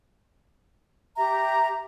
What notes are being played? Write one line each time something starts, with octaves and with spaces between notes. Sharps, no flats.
G4 E5 A#5